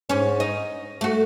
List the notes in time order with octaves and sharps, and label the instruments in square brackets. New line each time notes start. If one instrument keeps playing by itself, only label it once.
[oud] G#2 C#4
D#4
A3 F#4